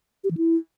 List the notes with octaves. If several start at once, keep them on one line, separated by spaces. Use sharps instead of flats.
G4
E3
E4